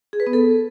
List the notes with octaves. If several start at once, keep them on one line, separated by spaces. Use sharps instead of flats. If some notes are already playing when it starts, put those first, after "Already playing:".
G#4
B4
B3
A4